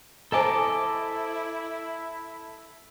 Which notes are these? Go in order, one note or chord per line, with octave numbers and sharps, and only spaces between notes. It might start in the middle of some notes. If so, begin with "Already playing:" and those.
E4 A4 C5 D#5 G#5 A#5 D6